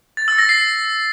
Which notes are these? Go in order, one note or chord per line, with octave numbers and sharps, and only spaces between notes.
A6
E6
A#6
C7